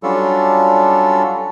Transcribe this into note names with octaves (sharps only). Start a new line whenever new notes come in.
F#3 G3 C#4 D4 F4 A4